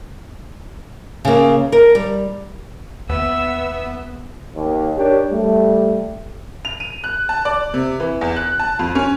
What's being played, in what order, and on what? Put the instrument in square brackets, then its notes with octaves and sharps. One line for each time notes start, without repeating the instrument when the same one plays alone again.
[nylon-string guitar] C#3 A#3
A#4
G3
[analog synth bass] D#2 [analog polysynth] B3 [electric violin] E5 E6
[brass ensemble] D#2
D4 G4 A#4 C#5
G3 A3
[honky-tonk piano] F7
D#7
F#6
A5
D5
C3
E3
E2
F#6
A5
F2
C#4